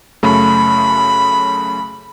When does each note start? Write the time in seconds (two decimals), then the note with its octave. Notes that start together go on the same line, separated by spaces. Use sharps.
0.23 F#2 C#3 A3 B5